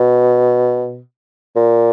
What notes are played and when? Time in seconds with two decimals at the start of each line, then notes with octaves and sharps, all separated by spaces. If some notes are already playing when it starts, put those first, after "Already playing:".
Already playing: B2
1.56 A#2